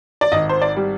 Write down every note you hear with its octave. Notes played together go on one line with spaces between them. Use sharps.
D5
G#1 D#5
C5
D5
G3